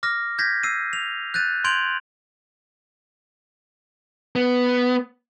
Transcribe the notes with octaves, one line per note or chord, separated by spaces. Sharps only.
D6 F6 A#6
G6 G#6 A#6 B6
E6 C7 D#7
F7
F#6 G6 A6 D#7
C6 G6 G#6 D7 F7 F#7
B3